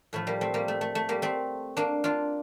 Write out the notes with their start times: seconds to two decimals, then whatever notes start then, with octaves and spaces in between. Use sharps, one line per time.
0.13 A2 F3 A3
0.27 G3 A#3
0.41 A3 C4
0.54 G3 A#3
0.68 A3
0.81 A3
0.95 A3
1.09 G3 A#3
1.22 A3 C4
1.77 A#3 D4
2.04 D4 F4